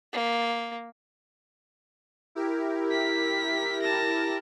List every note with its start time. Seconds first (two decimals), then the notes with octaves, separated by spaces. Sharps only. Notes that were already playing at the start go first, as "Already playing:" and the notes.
0.13 A#3
2.35 E4 G4 A#4
2.91 B6
3.82 A5 A#6